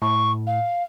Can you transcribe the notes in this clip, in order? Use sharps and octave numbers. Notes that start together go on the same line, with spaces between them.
A2 C#6
F5